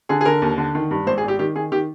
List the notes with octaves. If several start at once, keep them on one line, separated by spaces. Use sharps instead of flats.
D3 G#4
G#4
D3 A#4
D#2
D3
D#3
G2
G#1 C5
G#4
G#1 G4
D#3 G4
D#3 G#4
D#3 G4